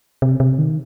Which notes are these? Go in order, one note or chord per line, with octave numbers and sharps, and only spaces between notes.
C3
C3
D#3